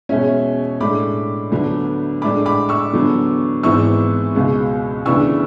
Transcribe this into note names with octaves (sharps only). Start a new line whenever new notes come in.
E2 B2 G#3 C#4 C#5 E5
A2 G#3 D4 B5 D6
D2 D3 F#3 B3
A2 G#3 D4 B5 D6
B5 D6
C#6 E6
E2 D3 F#3 B3
G#1 G#2 E3 B3 C#6 E6
C#2 B2 G#3
D2 C#3 E3 B3 D4 C#6 E6